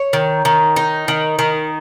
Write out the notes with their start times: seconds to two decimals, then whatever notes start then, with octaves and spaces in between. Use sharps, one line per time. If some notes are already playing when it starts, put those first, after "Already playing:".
Already playing: C#5
0.13 D#3
0.45 D#3
0.76 D#4
1.08 D#3
1.39 D#3